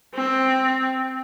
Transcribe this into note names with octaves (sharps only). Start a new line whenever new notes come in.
C4